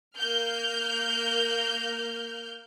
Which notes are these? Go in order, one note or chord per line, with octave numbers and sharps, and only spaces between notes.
A#3 F6 G6